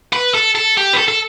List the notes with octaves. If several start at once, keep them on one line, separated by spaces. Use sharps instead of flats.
B4
A4
A4
G4
B4
A4
A4